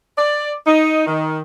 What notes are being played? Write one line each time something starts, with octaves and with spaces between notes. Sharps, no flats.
D5
D#4
D#3